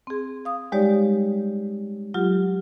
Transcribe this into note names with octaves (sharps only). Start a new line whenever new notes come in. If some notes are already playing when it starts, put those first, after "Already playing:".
C4 G#4
F5 D#6
G3 G#3 D#4 G4 C#5 D5
F#3 F4 G4